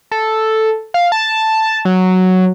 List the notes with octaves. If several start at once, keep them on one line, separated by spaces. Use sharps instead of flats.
A4
F5
A5
F#3